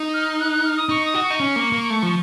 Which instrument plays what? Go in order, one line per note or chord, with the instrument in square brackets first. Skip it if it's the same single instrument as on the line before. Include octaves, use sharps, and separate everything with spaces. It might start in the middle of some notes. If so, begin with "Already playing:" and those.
Already playing: [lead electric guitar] D#4
[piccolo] F6
F#6
F#6
F6
D#6
[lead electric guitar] D#4 [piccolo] C#6
[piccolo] D#6
[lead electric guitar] F#4
[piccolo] C#6
[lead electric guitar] D#4
C#4
A#3
A#3
A3
F3